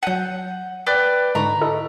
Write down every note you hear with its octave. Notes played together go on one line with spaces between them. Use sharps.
F#3 F#5 G6 D#7
B4 D5 G5
G#2 D3 G#3 A#5 B5 C#6
E4 A4 D#5